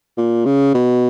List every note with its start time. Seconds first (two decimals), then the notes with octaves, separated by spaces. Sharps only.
0.17 A#2
0.45 C#3
0.74 B2